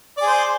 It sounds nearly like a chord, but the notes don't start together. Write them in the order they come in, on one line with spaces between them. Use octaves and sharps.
D5 G#4 C5